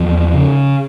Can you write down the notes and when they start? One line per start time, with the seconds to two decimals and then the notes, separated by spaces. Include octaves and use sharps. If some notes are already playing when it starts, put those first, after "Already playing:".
Already playing: E2 F3
0.34 C#3